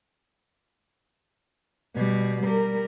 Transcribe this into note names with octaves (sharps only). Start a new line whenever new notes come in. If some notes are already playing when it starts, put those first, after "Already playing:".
B2 G3
G3 A#4